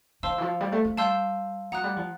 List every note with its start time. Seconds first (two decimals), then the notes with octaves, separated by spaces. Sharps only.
0.23 D#3 C5 F5 A5 C6 E6
0.38 E3
0.42 F3
0.61 G3
0.72 A3
0.85 A3
0.97 G3 F5 A5 C6 E6 G6
1.72 F#3 F#5 A#5 D#6 F#6
1.84 G3
1.97 F3